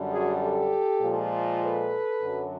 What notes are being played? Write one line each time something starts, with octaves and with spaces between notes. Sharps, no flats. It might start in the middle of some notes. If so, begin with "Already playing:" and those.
Already playing: F#2 D3 G3
F#4 G#4
G4 A4
A#2 F3 G#3
A4 B4
F#2 D3 F#3